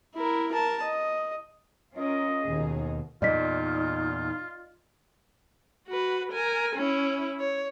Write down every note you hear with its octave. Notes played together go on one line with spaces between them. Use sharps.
E4 A#4
A#4 A5
D#5
C#4 F4 A#4 D#5
D#2 B2 D#4 G#4
E2 A#2 D#4 F4 D5 D#5 B6
F#4 B4
A#4 G#5
C#4 E4
C#5